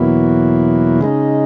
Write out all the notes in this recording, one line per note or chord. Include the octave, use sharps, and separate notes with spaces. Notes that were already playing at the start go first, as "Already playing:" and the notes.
Already playing: E2 B2 F#3 A#3 E4
C#3 G#3 D#4